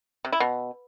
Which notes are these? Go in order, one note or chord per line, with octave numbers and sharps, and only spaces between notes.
C3
E4
B2